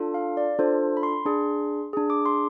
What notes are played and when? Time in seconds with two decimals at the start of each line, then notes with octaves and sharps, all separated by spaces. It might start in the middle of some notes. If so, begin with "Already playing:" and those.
Already playing: D4 F4 A4
0.14 F5
0.37 D5
0.59 D4 F4 A4 C5
0.97 B5
1.03 C6
1.25 D4 G#4
1.93 D4 G#4
2.10 D6
2.26 C6